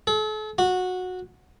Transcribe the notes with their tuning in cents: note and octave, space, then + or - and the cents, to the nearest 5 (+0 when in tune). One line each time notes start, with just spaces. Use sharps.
A4 -40
F#4 -15